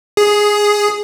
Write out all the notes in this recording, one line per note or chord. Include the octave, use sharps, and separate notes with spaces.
G#4